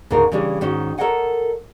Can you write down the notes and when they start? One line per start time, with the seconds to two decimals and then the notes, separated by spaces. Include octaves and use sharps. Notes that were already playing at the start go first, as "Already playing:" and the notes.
0.10 D2 G#2 C#3 D#4 A#4
0.32 C#3 E3 G3 C#4 D4
0.61 G#2 D#3 C#4 F#4
0.98 A4 A#4 C#5 D#5 F#5 G#5